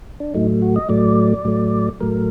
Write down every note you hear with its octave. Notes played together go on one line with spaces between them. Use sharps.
D4
A2 F#3 A3 D#4
F#4
D#5
A2 F#3 A3 D5
A2 F#3 A3
A2 F#3 A3 A#4